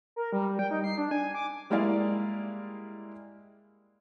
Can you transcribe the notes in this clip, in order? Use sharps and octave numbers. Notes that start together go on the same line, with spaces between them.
A#4
G3
G5
D#4
C7
D4
G#5
D6
G3 G#3 A#3 E4 D5 F5